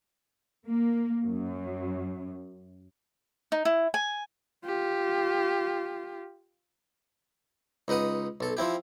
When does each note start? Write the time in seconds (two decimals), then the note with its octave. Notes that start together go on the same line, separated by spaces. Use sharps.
0.67 A#3
1.24 F#2
3.52 D#4
3.65 E4
3.94 G#5
4.65 F4 G4
7.88 C#2 D#4 B4 F#5 D#6
8.41 B1 A4
8.57 F3 C4 E4 G4